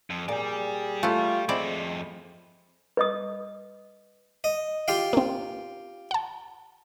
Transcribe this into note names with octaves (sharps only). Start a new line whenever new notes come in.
F2
A#2 G4 G#4 D5
A3 E4 F4
F2 G#3 C4 E4 D5 B5
B4 D#5 D#6
D#5
F4 G4 F5
A#3 C4
F#5 A5